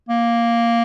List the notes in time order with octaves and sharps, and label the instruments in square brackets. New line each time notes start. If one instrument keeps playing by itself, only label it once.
[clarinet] A#3